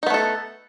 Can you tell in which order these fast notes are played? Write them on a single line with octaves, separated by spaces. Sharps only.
D#4 B3 A3 A4